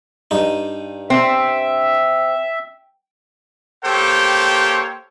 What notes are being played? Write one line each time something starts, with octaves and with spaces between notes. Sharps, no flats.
G2 D#4
C4 E5
A#3 G4 A4 C5 C#5 G5